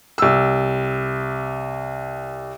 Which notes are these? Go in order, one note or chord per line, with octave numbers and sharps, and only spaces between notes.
C2 E6